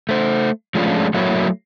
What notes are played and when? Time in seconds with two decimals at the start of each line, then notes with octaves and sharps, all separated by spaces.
0.09 A3 C5
0.75 F3 G#3 A3 C#4 D4 F4
1.14 F#3 A3 A#3 E4 F#4 C#5